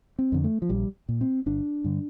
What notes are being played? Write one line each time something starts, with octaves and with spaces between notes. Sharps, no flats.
C4
F2 D3
A3
F3
A#1 G3
A#2
C4
G1 D4
G2 D3